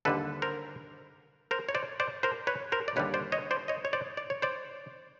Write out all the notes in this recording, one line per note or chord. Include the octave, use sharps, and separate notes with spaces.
D#2 D3 G3 A4 B4
A#4 C5
A#4 C5
C#5
C5 D5
C5 D5
A#4 C5
B4 C#5
A#4 C5
D5
D#2 D3 G3 B4 C#5
C5 D5
C#5 D#5
C5 D5
C#5 D#5
C#5
C5 D5
D5
C#5
C5 D5